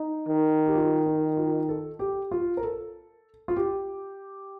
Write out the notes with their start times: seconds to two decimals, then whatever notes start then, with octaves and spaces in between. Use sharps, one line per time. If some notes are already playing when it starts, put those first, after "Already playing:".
Already playing: D#4
0.28 D#3
0.67 G4
0.75 F4
1.06 D#4
1.37 F4
1.69 A4
1.99 G4
2.31 F4
2.57 A#4
2.63 A4
3.48 F4
3.56 G4